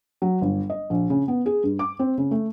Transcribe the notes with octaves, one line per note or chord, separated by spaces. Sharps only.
F#3
G1
D#5
A#1
C#3
B3
G#4
G2
D6
C4
C#3
A3